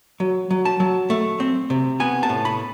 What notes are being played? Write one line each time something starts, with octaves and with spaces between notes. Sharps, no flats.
F#3
F#3
A5
F#3
A3
C4
C3
B3 G#5
A5
A2
B5